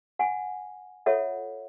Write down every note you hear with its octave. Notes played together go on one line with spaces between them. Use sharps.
F#5 G#5
F4 A4 C#5 E5 F#5